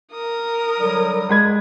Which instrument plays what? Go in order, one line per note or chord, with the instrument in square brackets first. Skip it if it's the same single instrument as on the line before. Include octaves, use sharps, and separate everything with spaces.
[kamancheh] A#4 D#6
[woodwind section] D3 F#3 G3
[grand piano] G#3 B5 G#6